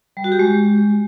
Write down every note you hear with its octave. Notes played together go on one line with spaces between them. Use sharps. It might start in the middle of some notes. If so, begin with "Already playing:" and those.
G3
F#4
G4
G#3